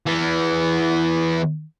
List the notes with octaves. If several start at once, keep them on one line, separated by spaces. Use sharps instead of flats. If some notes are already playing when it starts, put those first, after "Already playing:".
E3 B3